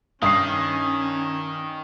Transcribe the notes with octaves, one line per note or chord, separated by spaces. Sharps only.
G2 D#3 C#4 D#6 C7